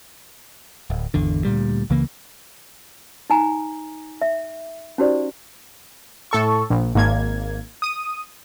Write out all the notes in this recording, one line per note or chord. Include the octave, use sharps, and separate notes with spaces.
D1
G#1 E2 D3
D2 A#2 G3
C#2 C#3 E3 A#3
D#4 G#5 A#5
E5
C#4 D#4 F#4 G4 C5 D5
A2 A4 C#6
A#1
G#1 A#3 G#6
D#6 D#7